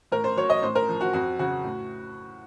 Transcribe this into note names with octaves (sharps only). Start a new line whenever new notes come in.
A2 A#4
C5
F#3 C#5
D#5
A2 C5
A#4
F3
F#4
F2 F#4
C#3 F#3 F#4
A2